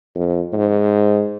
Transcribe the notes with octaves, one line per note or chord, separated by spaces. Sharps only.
F2
G#2